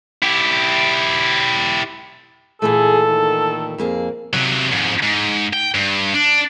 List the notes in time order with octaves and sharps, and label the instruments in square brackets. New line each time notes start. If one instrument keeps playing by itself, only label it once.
[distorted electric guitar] E4 G4
[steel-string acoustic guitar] A#2 E3 A3 [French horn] G#4 [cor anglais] A4
[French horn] D#3
[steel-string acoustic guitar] F2 A#3 G#4
[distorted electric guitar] C3 F#3
F2 G#2
G#2
G5
G2
D4